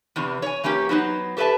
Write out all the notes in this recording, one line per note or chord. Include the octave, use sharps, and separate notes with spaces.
E2 C3 E3
C#5 G#5
E3 A#3 C#4 G4
F#3 B3 D#4 C5
G4 A4 B4 C5 E5 A5